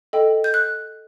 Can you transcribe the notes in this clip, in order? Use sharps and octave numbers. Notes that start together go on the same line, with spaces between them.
A4 D#5 G5
G6
F#6